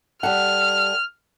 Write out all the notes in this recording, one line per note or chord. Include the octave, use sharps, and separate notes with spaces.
G3 A4 F#5 F6